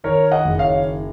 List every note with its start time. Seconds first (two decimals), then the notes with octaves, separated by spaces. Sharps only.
0.04 D#3 A#4 C#5
0.31 D#5 F#5
0.45 F#1
0.59 C#5 F5